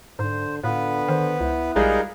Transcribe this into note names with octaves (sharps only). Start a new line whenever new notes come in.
G#2 D3 C5
A2 D3 B3 F4 B4
D#3 C5
C#2 E4
A#1 G3 G#3 D#4 F4 G#4 A#4